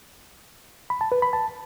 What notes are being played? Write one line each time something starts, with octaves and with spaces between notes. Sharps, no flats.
B5
A5
B4
B5
A5